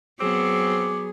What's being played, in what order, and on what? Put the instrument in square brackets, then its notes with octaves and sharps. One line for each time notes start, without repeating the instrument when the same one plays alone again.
[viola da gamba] F#3 B3 [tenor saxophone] C4 [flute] G#4 [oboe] D6